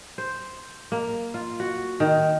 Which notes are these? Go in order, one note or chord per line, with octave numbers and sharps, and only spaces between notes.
C5
A#3
F4
F#4
D#3